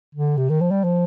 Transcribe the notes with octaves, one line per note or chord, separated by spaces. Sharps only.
D3
C3
D#3
F3
G3
F3